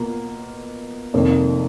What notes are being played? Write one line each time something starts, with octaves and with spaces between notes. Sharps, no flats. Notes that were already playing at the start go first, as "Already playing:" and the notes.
Already playing: B2 A#3 F4
F1 F2 D#3 A#3 D#4